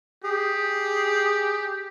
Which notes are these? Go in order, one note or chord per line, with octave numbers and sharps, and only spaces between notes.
G4 G#4